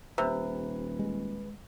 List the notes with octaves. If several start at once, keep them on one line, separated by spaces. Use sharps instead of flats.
D#1 C3 B4
G#3